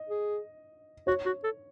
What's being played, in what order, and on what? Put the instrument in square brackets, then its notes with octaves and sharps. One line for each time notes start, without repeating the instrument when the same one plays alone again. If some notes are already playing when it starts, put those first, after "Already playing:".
Already playing: [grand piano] D#5
[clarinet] G#4
[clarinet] F#4 [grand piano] C#5
[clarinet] F#4
A4